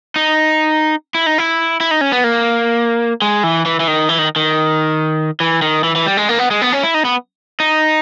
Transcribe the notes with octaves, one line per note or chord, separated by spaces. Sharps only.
D#4
E4
D#4
E4
E4
D#4
C#4
B3
A#3
G#3
E3
E3
E3
D#3
E3
D#3
D#3
E3
D#3
E3
E3
G3
G#3
A#3
B3
G#3
B3
C#4
E4
D#4
B3
D#4